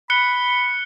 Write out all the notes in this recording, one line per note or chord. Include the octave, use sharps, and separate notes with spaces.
B5 F#6 C#7 G7